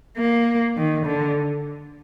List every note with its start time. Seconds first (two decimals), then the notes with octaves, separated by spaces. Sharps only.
0.18 A#3
0.77 D#3
1.06 D3